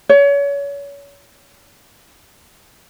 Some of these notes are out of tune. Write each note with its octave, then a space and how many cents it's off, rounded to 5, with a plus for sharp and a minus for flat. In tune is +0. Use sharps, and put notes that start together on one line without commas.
C#5 +30